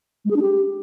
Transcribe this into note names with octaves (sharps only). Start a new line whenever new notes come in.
G#3
G#4
D4
G4